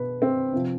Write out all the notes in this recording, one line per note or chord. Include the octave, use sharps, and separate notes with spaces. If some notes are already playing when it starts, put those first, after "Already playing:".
Already playing: B2 B4
C4
C3 F3